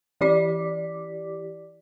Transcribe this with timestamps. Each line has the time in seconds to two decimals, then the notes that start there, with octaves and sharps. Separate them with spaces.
0.21 E3 E4 G4 D5 D6 B6